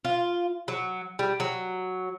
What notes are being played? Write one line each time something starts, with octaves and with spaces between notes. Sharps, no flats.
F4
F#3
G3
F#3